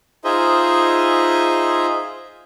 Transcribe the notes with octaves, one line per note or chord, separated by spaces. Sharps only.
D#4 F4 G#4 C5 D#5 E5